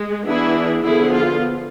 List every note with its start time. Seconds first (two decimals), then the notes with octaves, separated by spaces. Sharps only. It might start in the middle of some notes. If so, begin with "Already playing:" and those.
Already playing: G#3
0.26 E3 B3 D4 E4 G#4
0.84 D3 F3 B3 E4 G#4
1.12 F4